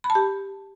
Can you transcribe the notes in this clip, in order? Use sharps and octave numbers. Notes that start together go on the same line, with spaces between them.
B5
A5
G4